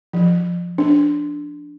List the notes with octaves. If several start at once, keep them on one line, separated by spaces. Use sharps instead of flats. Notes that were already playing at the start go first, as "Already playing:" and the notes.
F3
D4